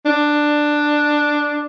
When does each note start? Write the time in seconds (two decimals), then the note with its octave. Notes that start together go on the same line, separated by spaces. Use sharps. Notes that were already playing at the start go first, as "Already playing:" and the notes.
0.06 D4